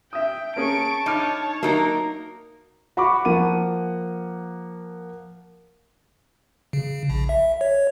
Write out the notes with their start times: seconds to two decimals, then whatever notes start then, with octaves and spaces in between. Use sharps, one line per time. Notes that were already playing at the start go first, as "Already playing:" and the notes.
0.13 E5 G5 D#6
0.56 A#3 C#4 G#4 A5 C#6 D7
1.06 D#4 C#5 B5 D6 F6
1.63 F#3 A#3 D#4 A#4
2.97 F#4 B5 C#6 D6
3.25 F3 A#3 F#5 D#7
6.73 C#3
7.10 A#1
7.29 E5
7.61 C#5